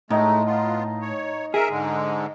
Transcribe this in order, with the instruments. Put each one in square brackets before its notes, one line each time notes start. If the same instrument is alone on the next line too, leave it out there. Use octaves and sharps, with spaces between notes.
[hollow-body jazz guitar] A2 [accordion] G#3 A3 [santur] D#4 D#5 A#5
[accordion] B3 F4
C#5
[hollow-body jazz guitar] G#4 [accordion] A#4 E5
[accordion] G#2 D3 G#3